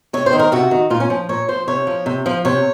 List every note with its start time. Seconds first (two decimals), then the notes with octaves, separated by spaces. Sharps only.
0.13 C3 C#5
0.26 C5
0.33 D#3
0.39 A#4
0.52 C3 F#4
0.71 D#3
0.90 A#2 F4
1.00 C#4
1.10 F3
1.29 A#2 C#5
1.48 F3 C5
1.67 C3 C#5
1.87 F3
2.06 C3
2.26 F3
2.45 C3 C#5